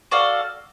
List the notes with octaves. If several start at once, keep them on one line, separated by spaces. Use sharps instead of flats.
F#4 A4 D5 F5